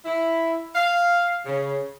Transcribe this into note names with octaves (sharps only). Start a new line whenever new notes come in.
E4
F5
C#3